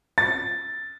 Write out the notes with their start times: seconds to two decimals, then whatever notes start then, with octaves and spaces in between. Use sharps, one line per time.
0.18 A6